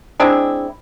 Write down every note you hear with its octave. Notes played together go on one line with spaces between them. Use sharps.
G#3 C4 D4 E4